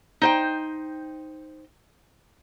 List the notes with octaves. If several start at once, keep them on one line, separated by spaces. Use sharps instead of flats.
D#4 C5 G5